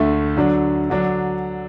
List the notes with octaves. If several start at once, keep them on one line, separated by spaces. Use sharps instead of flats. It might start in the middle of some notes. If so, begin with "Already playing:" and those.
Already playing: D2 D3 A3
D3 F#3 D4
D3 F#3 D4